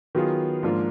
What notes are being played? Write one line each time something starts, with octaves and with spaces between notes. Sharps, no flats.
D#3 F#3 B3 F4 G#4
G#2 F3 A#3 D4 F4